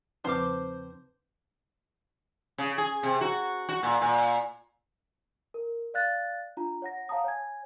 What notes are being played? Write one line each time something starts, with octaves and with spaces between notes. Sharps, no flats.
E2 C#3 F3 C4 D#4 B4 C5 D6
C#3
G#4
C3
F#4
F#4
A#2
A#2
A#4
D5 F5 F#6 A6
D4 F4 A#5
C#5 F#5 A#6
C#5 F5 F#5 A5 A#5 D#6
C#5 G#5 G#6